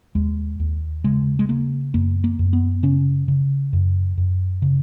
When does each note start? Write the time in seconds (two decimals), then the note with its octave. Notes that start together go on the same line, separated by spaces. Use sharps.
0.15 D#2 G#3
0.60 D#2
1.04 C#3 G#3
1.39 G#3
1.49 C#3 A#3
1.94 F#2 A#3
2.24 A#3
2.39 F#2
2.53 B3
2.83 C#3 C#4
3.28 C#3
3.73 F#2
4.18 F#2
4.62 C#3